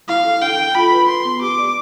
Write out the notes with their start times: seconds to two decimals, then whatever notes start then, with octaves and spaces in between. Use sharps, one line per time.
0.08 E4 F5
0.25 A4
0.42 D4 G5
0.59 A4
0.75 F4 B5
0.92 B4
1.08 B4 C6
1.25 B3
1.42 G4 D6
1.58 D5